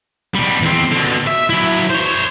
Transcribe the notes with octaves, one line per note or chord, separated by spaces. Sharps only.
B2 G3
E2 C4
B2 D3
E5
F#3 E4
C5 C#5